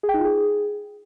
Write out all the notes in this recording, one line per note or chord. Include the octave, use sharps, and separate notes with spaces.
G#4
G5
D#4
F4
G#4